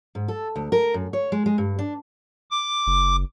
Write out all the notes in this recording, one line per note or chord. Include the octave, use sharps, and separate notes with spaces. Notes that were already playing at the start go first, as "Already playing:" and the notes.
G#2
A4
D2
A#4
F#2
C#5
G#3
G#3
G2
D4
D6
F#1